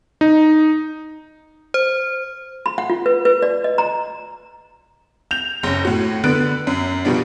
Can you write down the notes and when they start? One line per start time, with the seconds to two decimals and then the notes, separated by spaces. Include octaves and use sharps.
0.21 D#4
1.74 C5
2.66 B5
2.78 F#5
2.90 F4
3.06 B4
3.25 B4
3.42 D5
3.64 D#5
3.78 A#5
5.31 G6 F7
5.63 F#1 C#4
5.85 A2 F#4
6.24 D3 B3 B4 F#6 D7
6.67 F#2
7.05 B2 F3 G3 B3 D4